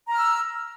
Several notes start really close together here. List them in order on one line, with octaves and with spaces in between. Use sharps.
A#5 F6 E6